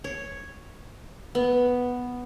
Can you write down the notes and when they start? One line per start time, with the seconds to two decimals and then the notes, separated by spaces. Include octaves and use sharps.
0.04 C#5
1.35 B3